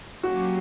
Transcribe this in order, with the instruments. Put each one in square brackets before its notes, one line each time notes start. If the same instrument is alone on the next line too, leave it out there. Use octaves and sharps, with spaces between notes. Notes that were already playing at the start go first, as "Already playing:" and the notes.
[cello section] F#3 A#3 C#4 G4 [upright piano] F#4